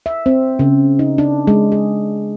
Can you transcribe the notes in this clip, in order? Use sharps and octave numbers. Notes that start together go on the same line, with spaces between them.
E5
C4
C#3
D#4
D4
G#3
G#4